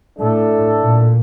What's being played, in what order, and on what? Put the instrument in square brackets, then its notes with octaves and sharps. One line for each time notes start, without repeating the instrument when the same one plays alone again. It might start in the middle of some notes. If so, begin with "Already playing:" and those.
[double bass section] A2 [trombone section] A3 D4 A4
[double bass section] A#2